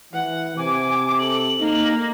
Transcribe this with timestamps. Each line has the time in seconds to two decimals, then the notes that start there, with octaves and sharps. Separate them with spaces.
0.13 E3 F#5
0.57 C3 G#5 D6
1.19 A4 F#7
1.60 A#3 D#4